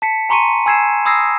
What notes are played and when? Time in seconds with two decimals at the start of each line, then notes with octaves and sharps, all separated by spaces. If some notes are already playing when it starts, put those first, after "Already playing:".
0.02 A5 B6 C#7
0.29 G#5 A#5 C6 C#6 C#7 D#7
0.66 G#5 E6 G#6 C7 E7
1.05 B5 D#6 E6 G#6 A#6 C7